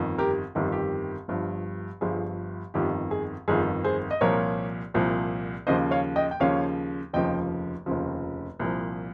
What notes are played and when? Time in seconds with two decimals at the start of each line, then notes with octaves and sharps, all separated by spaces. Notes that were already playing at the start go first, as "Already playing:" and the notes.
Already playing: G1 F2 D#3
0.18 G4 A#4
0.55 G1 F2 D#3 G4
0.72 G4
1.28 G1 G2 F3
2.01 G1 G2 F3 G#4
2.74 G1 F2 D#3 G4
3.11 G#4
3.48 G1 F2 D#3 G#4
3.84 G#4 C5
4.11 D#5
4.21 C2 A#2 F3 A#4 C#5
4.94 C2 A#2 F3
5.67 D#2 C#3 F3 C5 D#5
5.91 C#5 F5
6.16 D#5 G5
6.31 G5
6.40 D#2 C#3 F3 C#5 F5
7.13 F1 D#2 C#3 F3 D#5 G5
7.86 F1 D#2 C#3 F3
8.59 C2 A#2 F3